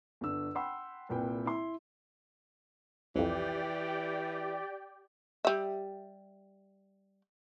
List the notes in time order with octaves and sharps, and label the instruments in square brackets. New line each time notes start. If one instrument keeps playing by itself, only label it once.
[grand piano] G1 D4 E6
F#5 G5 B5 C6 E6
C2 A#2 B4 G5
E4 C6
[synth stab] C2 F2 [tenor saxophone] E3 [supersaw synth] G4 D5 G5
[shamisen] G3 E5